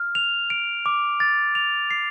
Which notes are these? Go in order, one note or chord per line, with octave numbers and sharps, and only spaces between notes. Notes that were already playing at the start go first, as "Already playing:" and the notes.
Already playing: F6
F7
D7
D6
A6
F7
C7